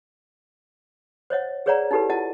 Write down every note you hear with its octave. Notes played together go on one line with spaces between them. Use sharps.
C5 C#5 D#5 F#5
G#4 B4 C#5 D5 F#5 A#5
D#4 E4 G4 A4 B4
E4 F4 D#5 F#5 A5